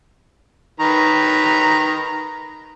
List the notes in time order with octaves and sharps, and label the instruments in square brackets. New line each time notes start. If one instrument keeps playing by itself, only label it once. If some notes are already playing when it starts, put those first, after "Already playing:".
[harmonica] D#3 B4 A#5